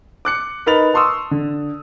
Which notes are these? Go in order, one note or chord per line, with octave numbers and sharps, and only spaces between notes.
D6 F#6 C#7
D#4 A#4 B4 B5 A6 F7
A5 C6 C#6 D#6 E6
D3